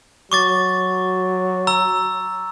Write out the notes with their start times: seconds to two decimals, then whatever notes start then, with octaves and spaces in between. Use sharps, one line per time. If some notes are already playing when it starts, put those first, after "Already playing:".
0.32 F#3 C#6 D6 A6
1.67 A#5 E6